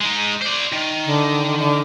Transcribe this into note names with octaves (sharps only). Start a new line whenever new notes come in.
G#3 D#4
C5 D5
D#3
D3
D3